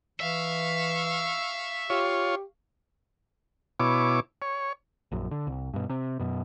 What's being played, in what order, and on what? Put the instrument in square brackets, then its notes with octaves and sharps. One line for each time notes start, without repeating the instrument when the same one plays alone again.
[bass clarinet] E3 [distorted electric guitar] E5 [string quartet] F5 C#6
[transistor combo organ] F4 C#5 [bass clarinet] G4
[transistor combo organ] B2 E4 C#5 D6
C#5
[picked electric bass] A#1 F#2
D3
C2
G2 B2
C3
F#2 B2